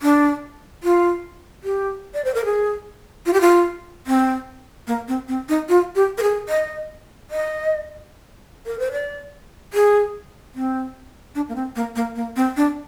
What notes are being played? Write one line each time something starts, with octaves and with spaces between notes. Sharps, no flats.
D4
F4
G4
D5
C5
A#4
G#4
F4
G4
F4
C4
A#3
C4
C4
D#4
F4
G4
A#4
G#4
D#5
D#5
A#4
C5
D5
G#4
C4
D4
A#3
C4
A#3
A#3
A#3
C4
D4